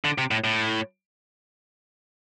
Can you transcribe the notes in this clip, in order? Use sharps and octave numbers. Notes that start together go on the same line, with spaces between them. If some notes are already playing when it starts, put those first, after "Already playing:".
D3
C3
A2
A2